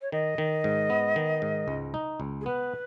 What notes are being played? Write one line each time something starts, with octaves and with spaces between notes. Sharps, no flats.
C#5
D#3 D#5
D#3
G#2
B3
D#3
G#2
C#2
D#4
C#2
G#4
B3 B4